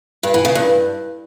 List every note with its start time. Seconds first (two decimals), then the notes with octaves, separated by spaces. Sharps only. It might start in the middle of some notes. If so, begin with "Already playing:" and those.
0.23 G2
0.34 E3
0.45 C#3
0.55 G2